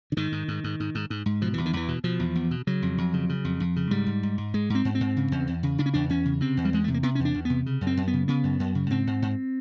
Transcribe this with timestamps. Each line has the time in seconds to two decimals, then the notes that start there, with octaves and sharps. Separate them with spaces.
0.12 D3
0.17 G#2 D#3
0.32 G#2
0.48 G#2
0.64 G#2
0.80 G#2
0.95 G#2
1.10 G#2
1.26 G#2
1.41 B2 F3
1.54 E2 E3
1.66 D#3
1.73 E2 E3
1.88 B2
2.04 B2 F3
2.19 E2
2.35 E2
2.51 B2
2.67 C#3 F#3
2.82 F2
2.98 F2
3.14 C#3
3.29 C#3
3.44 F2
3.60 F2
3.76 C#3
3.91 G#2 G3
4.07 G#2
4.23 G#2
4.38 G#2
4.54 G#2 G#3
4.70 G#2 C4
4.85 G#2
4.95 C4
5.00 G#2
5.17 C#3
5.32 E2
5.48 E2
5.63 C#3
5.78 C#3 D4
5.86 C#4
5.94 E2 D4
6.09 E2 C#4
6.25 C#3
6.40 C3 C4
6.57 E2
6.65 G3
6.73 E2 G#3
6.84 C3 A3
6.94 A#3
7.03 C3 B3
7.15 C#4
7.20 E2
7.25 D4
7.35 E2
7.45 C3 B3
7.66 C#3
7.81 F#2
7.87 C4
7.97 F#2
8.07 B3
8.13 C#3
8.28 C#3 B3
8.44 F#2
8.60 F#2
8.75 C#3
8.90 G#2 C4
9.07 G#2
9.22 G#2